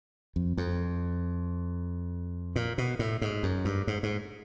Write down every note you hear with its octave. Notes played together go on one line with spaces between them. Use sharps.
F2
F2
A#2
B2
A2
G#2
F#2
G2
G#2
G#2